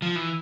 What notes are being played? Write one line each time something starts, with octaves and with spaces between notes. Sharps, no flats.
F3
E3